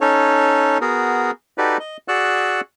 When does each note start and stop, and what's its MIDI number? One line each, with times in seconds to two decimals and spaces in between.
0.01 0.78 61
0.01 0.78 63
0.01 0.78 69
0.01 0.78 73
0.81 1.31 59
0.81 1.31 66
0.81 1.31 68
0.81 1.31 70
1.58 1.77 63
1.58 1.77 66
1.58 1.77 67
1.58 1.77 69
1.58 1.77 71
1.58 1.77 74
1.80 1.97 75
2.08 2.61 66
2.08 2.61 68
2.08 2.61 74
2.08 2.61 85
2.08 2.61 88
2.08 2.61 90